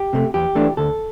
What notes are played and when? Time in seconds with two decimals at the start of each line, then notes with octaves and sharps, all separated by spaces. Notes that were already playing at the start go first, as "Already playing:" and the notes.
Already playing: G4
0.13 C3 A3
0.34 E2 G4
0.55 E3 A3 D4
0.77 D2 A4